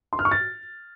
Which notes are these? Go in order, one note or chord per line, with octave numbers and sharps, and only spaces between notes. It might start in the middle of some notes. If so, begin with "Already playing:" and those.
C6
F6
C#6
A6